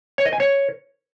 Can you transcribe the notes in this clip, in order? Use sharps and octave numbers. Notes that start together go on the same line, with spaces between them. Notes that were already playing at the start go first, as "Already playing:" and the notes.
C#5
D#5
G#5
C#5